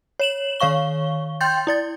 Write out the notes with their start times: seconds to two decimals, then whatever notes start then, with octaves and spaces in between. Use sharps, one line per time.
0.20 C#5 E7 F#7
0.60 D#3 C#5 F5 C#6 G7
1.41 G5 C6 G6 A6
1.67 E4 D5 A6